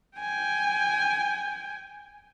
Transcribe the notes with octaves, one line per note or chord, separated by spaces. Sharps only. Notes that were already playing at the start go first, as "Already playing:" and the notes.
G5 G#5